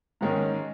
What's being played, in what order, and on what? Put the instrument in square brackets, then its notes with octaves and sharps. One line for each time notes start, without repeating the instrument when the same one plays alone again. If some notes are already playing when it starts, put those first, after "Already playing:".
[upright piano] G#2 D#3 G#3 C#4